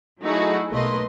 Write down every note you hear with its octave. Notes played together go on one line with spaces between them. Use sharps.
F#3 A3 D#4 E4 F#4 G#4
B1 A3 A#3 B4 D#5 C6